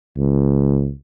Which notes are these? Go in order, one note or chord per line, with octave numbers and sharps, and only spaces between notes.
C#2